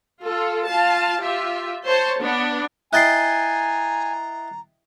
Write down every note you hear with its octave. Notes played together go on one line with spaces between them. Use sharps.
F4 A4
F4 F5 A5
F4 G4 E5
C5 C#5 A5
B3 D4
E4 D#5 G5 G#5 A#5 F#6 A6 C7